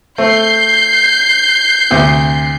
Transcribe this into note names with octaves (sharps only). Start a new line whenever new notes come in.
A3 C4 G6 C7
D2 C3